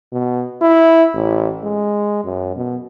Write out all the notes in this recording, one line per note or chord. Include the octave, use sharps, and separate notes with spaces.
B2
E4
A1
G#3
F#2
B2